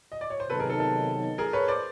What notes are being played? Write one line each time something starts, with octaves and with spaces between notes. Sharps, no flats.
D#5
D5
C#5
C5
C3 D#3 F#3 B3 D#4 A4 B4
G#4 A#4
A4
A4
G#4 A#4
B4 C#5
C5 D5